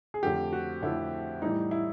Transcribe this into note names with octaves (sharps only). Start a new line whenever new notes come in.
G#4
F2 D3 F3 A3 G4
F#4
F2 D3 F3 A3 E4
A2 E3 G3 D#4
E4